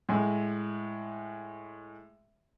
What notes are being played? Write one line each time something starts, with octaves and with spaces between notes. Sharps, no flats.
A2 G#3